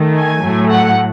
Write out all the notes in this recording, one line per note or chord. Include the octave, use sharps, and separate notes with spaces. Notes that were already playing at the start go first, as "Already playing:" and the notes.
Already playing: D#3 A3
G#5
A2 F#3 A3
F#5